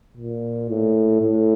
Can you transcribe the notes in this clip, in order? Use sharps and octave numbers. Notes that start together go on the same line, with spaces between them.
A#2
A2
A2